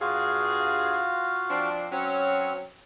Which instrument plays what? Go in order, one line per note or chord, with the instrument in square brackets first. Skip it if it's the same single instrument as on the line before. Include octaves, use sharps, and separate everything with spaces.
[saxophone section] G2 G#4 [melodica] F4 F#4 F5
[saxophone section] F3 C4 D4
[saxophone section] F#3 C#4 [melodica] C4